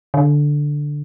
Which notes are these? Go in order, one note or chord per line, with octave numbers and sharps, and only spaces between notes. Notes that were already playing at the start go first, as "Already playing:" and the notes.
D3